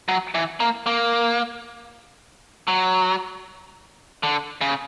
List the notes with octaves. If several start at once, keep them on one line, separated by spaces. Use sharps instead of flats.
F#3
E3
A#3
A#3
F#3
D3
C#3